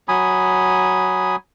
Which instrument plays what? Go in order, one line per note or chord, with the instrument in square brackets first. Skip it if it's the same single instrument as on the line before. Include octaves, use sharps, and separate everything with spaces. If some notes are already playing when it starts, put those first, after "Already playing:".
[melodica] F#3 G#5 B5 D#6